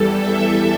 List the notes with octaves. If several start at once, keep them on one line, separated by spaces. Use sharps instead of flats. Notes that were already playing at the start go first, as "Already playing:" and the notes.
Already playing: E2 E3 G3 A4
E5